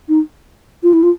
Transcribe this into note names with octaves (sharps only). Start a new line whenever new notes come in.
D#4
F4
E4
F4